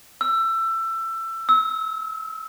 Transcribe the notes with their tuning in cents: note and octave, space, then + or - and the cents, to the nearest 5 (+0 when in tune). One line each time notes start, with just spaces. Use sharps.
E6 +20
E6 -30